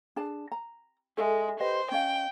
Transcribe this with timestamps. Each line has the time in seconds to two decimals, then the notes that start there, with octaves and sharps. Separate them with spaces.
0.16 D4 G#4 A5
0.52 A#5
1.17 G#3 A4 D#5 E5
1.60 G4 B4 C5 D#5
1.92 C#4 D#5 F5 G5